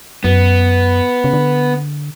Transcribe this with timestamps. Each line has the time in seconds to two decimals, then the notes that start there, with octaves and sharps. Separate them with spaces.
0.24 F#2 B3
1.24 C#3
1.34 D3